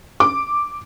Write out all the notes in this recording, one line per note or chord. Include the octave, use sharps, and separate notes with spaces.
D6